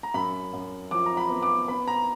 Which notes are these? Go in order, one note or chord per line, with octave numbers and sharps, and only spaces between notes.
A#5
F#2 B5
F#2
F3 D6
A#5
B5
B3
D6
B3 B5
A#5